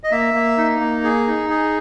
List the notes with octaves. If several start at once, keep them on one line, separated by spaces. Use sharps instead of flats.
D#5
A#3 E5
A#3
D#4
A#3
G#4
D#4
G#4